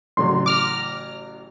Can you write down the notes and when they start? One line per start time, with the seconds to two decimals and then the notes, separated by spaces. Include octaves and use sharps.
0.17 A1 C#3 F#3 C6
0.46 D6 F6 A#6